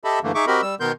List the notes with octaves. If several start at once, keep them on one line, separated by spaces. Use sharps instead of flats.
G4 A4 D#5 E5 A5 B5
G2 D3 E3 A3 A#3
D#4 G#4 E5 C#6 D6
C4 F#4 G4 A#4 D#5 B5
G3 E6
B2 D#3 B3 A#4 C6 G6